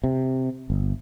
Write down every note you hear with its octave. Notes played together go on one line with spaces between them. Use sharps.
C3
G1